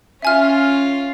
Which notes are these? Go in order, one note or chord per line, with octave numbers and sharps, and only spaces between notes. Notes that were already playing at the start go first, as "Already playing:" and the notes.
C#4 F4 E5 G#5 F6